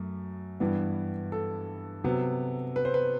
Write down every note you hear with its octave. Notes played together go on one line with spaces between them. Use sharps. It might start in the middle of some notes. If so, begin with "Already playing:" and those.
Already playing: F#2 A3
G2 E3 G3 B3
A4
C3 F#3 B3
B4
C5
B4